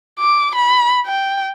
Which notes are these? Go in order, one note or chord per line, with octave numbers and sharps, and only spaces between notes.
D6
B5
G5